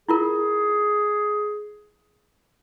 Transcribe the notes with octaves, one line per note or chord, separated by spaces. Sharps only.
E4 F4 G#4 A#4